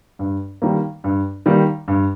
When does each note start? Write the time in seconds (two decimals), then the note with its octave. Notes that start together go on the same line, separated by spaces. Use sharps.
0.19 G2
0.62 D#3 G3 A#3
1.04 G2
1.46 D#3 G3 A#3
1.88 G2